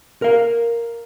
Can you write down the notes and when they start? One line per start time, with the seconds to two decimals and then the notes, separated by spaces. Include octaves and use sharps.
0.22 A#4 F5